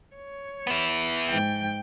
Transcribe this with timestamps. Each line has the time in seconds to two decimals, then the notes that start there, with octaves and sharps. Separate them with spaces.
0.16 C#5
0.67 B3 E4
1.29 G#2 G5